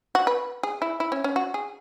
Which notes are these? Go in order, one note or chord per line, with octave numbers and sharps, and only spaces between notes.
F#4
B4
G#4
E4
E4
C#4
C#4
F#4
G#4